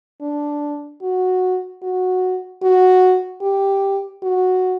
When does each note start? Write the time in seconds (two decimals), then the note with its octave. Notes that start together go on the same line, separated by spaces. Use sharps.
0.22 D4
1.03 F#4
1.83 F#4
2.63 F#4
3.42 G4
4.23 F#4